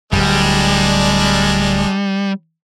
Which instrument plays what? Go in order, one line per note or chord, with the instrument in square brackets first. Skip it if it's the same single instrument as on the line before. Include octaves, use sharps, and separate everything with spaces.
[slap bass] D1 G#1 [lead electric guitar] G3 [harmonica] G#3 D4